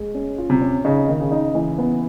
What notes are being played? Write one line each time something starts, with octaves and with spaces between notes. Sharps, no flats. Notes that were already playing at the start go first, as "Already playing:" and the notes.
Already playing: G#3
C#4
F4
C3
C#4
C#3 D#4
D#3
C#3
D#4
E3
B3